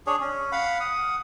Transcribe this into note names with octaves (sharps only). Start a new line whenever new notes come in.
D4 G#4 C#5
C#4
F5 F#5 B5
F#5 D#6